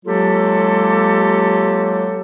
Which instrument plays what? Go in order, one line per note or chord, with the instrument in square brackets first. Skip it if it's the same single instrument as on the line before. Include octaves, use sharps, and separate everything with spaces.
[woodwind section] F#3 G#3 A#3 F4 G4 A4